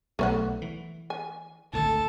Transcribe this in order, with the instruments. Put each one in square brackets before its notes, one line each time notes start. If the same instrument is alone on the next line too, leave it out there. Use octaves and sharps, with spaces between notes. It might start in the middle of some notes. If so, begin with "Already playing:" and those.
[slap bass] B1 [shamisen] A3 C5 F#5
[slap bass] E3
[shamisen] G#5
[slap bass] G#1 D2 A2 [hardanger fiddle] A4